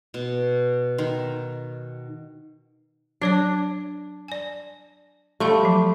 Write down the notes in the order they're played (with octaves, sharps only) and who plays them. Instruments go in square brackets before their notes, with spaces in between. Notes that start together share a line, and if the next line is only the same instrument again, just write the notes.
[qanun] B2
D#3
[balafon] F#3 C#5 D5 [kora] D4
[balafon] D5 G#5
[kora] G3 A3 [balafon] F5 C6 C#6
[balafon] F3 F#3